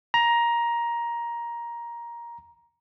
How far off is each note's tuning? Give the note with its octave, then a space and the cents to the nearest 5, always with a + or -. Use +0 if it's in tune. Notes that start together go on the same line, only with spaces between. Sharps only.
A#5 +15